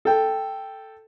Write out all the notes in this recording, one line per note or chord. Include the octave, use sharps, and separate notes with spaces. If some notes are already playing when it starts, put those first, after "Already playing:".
A4 G5